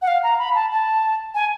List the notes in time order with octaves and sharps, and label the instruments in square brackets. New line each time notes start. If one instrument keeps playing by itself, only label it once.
[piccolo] F#5
F5
A#5
B5
A5
A5
G#5